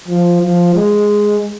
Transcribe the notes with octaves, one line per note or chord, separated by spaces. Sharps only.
F3
F3
G#3